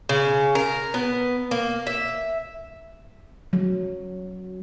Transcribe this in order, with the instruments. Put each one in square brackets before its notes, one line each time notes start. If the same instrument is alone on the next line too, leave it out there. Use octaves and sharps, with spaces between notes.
[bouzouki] C#3
A#4
B3
A#3
E5
[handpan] F#3